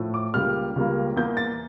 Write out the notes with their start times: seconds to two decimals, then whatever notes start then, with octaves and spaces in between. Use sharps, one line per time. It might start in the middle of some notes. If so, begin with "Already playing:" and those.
Already playing: A2 F3 A3
0.14 D6
0.34 C#2 C#3 G3 A#3 F6
0.76 C#2 C#3 G3 A#3
1.16 E2 E3 A#3 G6
1.37 A6